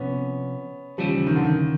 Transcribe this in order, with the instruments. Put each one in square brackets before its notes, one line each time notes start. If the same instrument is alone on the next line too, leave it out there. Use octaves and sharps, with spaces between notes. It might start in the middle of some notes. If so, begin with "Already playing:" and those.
Already playing: [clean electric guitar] C3 F3 A#3 [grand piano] B3 C#4
[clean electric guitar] D#2 C#3 E3 [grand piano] F3 G3
[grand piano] D#3
D3
D#3